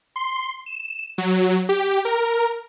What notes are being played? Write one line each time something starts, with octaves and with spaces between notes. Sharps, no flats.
C6
E7
F#3
G4
A#4